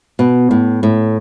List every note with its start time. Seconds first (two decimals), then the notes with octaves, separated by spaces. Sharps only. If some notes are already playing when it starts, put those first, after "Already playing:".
0.19 B2
0.51 A2
0.83 A2